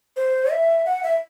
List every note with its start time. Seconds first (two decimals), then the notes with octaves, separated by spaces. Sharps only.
0.16 C5
0.51 E5
0.86 F#5
1.03 E5